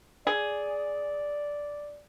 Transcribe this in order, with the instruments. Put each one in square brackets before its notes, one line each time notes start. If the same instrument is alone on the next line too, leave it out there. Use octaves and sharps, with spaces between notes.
[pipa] G#4 [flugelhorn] D5